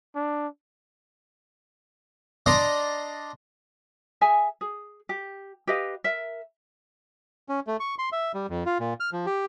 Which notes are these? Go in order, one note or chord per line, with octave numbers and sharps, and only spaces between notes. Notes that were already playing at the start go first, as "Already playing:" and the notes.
D4
D4 D5 D#5 A#5 C6
G#4 E5 G#5
G#4
G4
G4 B4 D#5 F5
A#4 E5
C#4
A3
C#6
C6
E5
G3
F2
F4
A#2
F6
F3
G4